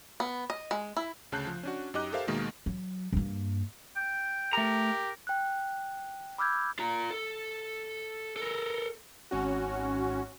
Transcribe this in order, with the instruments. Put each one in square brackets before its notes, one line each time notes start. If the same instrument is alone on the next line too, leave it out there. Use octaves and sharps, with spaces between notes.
[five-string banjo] B3
D#5
G#3
E4
[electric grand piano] D2 C#3 A5 F#6 G6 C7
F3
C#4 D4 F#4
F#2 D#4 G4 D#5 D6 F#6
G4 A4 A#4 C5 E5 F5
D#2 B2 D#3 G#3 A#3
[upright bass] F#3
G2 A#3
[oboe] G5
[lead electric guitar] A3 A#5 [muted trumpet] G4 [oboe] A#4
[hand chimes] G5 F#6
B5 D6 E6 F6 G6 G#6
[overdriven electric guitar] F4 A#5
A4
A4 A#4
[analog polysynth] G#1 C#4 F#4